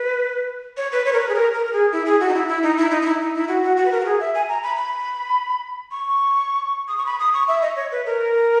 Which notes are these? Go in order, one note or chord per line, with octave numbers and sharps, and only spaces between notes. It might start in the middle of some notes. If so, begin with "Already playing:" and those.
Already playing: B4
C#5
B4
C#5
A#4
B4
G#4
A#4
A#4
A#4
G#4
E4
G#4
F#4
D#4
E4
E4
D#4
E4
D#4
D#4
E4
D#4
E4
F#4
F#4
F#4
B4
A#4
F#4
G#4
E5
G#5
A#5
B5
B5
C#6
D#6
C#6
B5
D#6
C#6
E5
D#5
C#5
B4
A#4